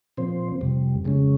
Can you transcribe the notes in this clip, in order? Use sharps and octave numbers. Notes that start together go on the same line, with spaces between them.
A#2 F3 C4 C5
F2 C3 G3
F2 C#3 G#3 C#4